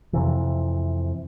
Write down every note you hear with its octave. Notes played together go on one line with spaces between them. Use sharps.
F2 C3 E3